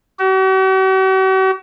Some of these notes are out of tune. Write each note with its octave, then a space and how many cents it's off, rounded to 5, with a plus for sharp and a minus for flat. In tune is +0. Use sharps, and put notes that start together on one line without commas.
F#4 +45